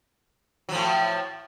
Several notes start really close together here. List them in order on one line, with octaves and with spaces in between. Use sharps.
F#3 F3 A2